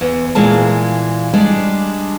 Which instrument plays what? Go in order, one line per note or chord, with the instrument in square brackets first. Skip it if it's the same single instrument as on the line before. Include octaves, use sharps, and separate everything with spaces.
[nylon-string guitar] E2
A#2 E3 G#3 F4 A5
G3 G#3 D4